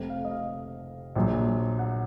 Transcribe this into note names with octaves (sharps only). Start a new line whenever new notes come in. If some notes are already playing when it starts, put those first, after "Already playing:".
Already playing: F1 F2 C3
F5
D#5
F5
A#1 A#2 F#3
F#5